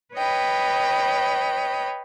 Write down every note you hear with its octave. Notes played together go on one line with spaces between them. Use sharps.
B4 C#5 D#5 G5 B5